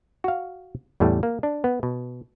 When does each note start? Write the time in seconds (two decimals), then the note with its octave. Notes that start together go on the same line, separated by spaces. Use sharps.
0.24 F#4 F5
1.00 E2 A2 G3 A3
1.23 A#3
1.43 D4
1.64 B3
1.83 B2